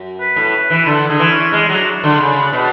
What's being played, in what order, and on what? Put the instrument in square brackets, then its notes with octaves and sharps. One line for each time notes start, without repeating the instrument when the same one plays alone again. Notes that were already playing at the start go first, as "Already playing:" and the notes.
Already playing: [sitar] F#2
[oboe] B4
[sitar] A2
E3
[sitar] D3 [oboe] A4
[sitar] D3 [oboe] G#4
[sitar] E3
[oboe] C#4
[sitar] G#3 [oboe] D4
[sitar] F#3
D3
C#3
B2